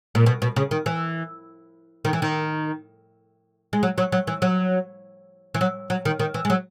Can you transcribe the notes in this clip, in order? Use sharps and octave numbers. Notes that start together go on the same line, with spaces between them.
A#2
B2
B2
C#3
D#3
E3
D#3
E3
D#3
G#3
F#3
F#3
F#3
E3
F#3
E3
F#3
F#3
D#3
D#3
E3
G#3
F#3